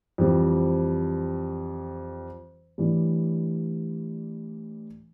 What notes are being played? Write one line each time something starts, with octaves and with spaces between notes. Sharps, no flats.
F2 E3 G3 C4
A2 E3 G3 D4